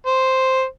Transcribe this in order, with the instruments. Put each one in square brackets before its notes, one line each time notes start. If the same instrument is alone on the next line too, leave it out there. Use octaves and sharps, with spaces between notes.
[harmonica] C5